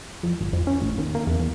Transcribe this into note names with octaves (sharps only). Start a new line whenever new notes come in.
F2
G#1
F2
C#4
A1
D#2
A#3
E2
E2